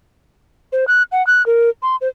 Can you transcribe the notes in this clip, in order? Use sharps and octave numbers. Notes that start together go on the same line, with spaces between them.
C5
F#6
F#5
F#6
A#4
C6
C5